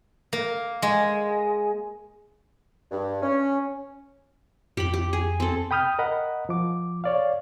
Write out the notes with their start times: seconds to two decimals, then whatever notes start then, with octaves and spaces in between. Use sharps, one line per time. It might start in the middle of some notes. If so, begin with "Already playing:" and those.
0.33 A#3
0.82 G#3
2.91 G2
3.22 C#4
4.77 F2 G4 B5
4.94 G4
5.13 G#4
5.40 C4 A4
5.71 G5 B5 D#6 F6 G6
5.99 A#4 D#5 F#5 B5
6.49 F3 D6
7.04 C#5 D5 F5